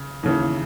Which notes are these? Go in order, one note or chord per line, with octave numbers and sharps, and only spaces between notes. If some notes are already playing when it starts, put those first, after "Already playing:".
Already playing: C#3
D#2 C#3 E3